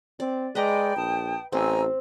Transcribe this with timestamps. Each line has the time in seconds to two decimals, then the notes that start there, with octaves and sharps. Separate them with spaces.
0.20 C4 D5
0.55 G#3 B4 D5 D#5 G5 A#5
0.96 A#1 A5 D#6
1.52 A1 C4 G#5 A#5 E6